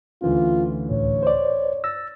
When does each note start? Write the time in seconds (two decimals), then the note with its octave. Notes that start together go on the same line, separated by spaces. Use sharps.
0.22 D2 E3 C#4 F4
0.91 C#2 A2 C#5
1.23 C5 D5
1.84 E6 A6 A#6